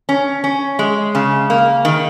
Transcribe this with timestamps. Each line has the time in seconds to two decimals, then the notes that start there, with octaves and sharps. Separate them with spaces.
0.09 C#4
0.44 C#4
0.79 G#3
1.15 C#3
1.50 A#3
1.85 D#3